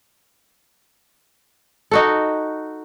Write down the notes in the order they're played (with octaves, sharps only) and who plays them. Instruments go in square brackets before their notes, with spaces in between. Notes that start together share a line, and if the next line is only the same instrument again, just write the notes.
[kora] D#4 F#4 A4